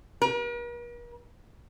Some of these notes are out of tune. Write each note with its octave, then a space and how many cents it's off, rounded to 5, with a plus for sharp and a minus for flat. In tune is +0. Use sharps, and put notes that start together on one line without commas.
A#4 +45